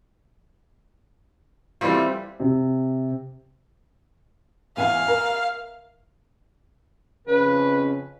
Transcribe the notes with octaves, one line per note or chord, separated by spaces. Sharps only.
E3 G3 A3 C4 F4
C3
E2 F5 G#5
A#4
F2 C#3 B4